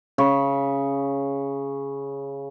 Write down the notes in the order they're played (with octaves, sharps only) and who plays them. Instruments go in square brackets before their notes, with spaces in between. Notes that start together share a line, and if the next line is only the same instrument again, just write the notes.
[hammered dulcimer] C#3 B5 C#6